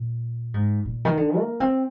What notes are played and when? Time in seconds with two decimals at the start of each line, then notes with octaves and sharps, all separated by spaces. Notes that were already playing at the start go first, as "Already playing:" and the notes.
Already playing: A#2
0.54 G#2
0.85 A#2
1.05 D#3
1.17 D3
1.38 A#3
1.60 C4